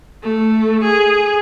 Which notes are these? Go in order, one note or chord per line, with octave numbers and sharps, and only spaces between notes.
A3
G#4